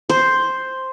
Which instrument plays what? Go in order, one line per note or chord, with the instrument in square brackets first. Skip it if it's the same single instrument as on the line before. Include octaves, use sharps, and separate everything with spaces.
[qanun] C5